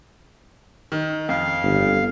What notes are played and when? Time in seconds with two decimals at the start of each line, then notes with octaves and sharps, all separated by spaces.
0.92 D#3
1.29 F2 F5
1.63 G1